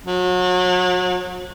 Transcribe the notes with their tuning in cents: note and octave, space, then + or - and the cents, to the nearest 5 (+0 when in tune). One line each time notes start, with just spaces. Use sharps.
F#3 -35